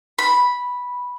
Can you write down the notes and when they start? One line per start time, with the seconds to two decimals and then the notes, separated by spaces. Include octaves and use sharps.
0.19 B5